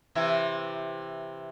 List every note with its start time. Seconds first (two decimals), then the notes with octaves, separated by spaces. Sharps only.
0.15 C3 E3 E4